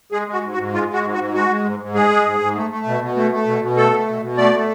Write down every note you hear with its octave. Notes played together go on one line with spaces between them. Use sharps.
G#3 G#4
G#3
F#4
G#2
F#4
G#2
G#3 F4
G#3
F#4
G#2
F#4
G#2
G#3 F#4
G#3
G#2
G#2
G#3 G#4
G#3
G#2
G#2
A3
A3
B2
B2
A3
A3
B2
B2
A3 A4
A3
B2
B2
A3 D5
A3